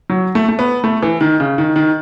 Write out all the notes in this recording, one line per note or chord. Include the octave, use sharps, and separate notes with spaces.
F#3
A3
A3
B3
A3
E3
D#3
C#3
D#3
D#3